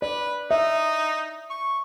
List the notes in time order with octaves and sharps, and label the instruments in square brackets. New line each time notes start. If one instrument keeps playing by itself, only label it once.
[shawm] B4 [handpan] D5
[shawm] D#4 [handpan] E5
[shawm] C#6